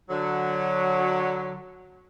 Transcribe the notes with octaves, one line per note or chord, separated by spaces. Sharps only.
D3 F#3